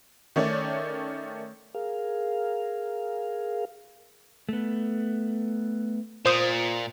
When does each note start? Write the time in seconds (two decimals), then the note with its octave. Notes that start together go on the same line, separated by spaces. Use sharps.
0.36 D#3 A3 C#4 C#5 D5
1.74 G#4 A#4 F5
4.49 A3 B3
6.26 A#2 C5 D#6